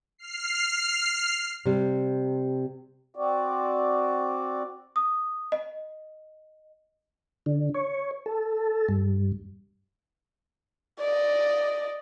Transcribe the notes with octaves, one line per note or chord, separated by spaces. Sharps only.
F6 C7
C3 G3
C4 F#4 D5
D#6
D#5
D3
C#5
A4
G2
D5 D#5